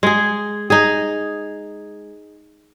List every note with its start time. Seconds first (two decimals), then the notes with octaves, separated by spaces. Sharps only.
0.03 G#3 G#4
0.70 D#4 G#4